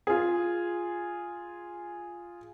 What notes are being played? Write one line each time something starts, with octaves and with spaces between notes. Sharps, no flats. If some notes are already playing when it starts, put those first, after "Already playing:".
F4 G#4